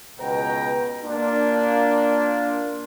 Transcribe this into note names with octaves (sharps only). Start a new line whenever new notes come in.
C#2 B2 B4 G5 A#5
A#3 D4 F4